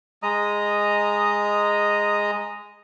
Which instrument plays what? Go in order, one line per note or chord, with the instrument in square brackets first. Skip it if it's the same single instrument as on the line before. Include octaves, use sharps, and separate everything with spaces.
[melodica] G#3 D#5 A#5 D#6